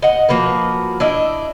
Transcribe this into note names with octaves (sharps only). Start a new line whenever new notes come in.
D#5 F#5
F3 A#3 F#4 B4
D4 E4 D#5